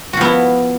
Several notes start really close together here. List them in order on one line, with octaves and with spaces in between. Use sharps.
F#4 F3 B3 E4